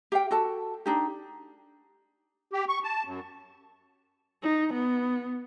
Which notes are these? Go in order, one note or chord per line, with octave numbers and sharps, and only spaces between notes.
G4 F5 G5
F#4 A4 A5
D4 D#4 G4
G4
C#6
A5
F#2
D#4
B3